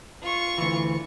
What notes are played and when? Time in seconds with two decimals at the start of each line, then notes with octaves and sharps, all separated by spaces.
0.22 F4 C#6
0.58 D2 E3